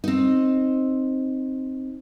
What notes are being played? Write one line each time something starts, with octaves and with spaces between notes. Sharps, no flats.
C4 D#4